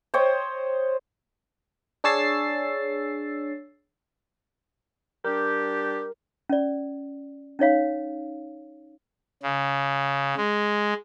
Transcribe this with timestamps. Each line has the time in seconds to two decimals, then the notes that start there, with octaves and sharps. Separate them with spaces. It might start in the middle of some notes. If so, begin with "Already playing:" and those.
0.14 C5 C#5 D#5 G5
2.04 D4 G#4 C#5 E6 A6 C7
5.25 G3 D4 G4 A#4
6.49 C#4 D5
7.59 C#4 D#4 C#5 F5
9.42 C#3
10.37 G#3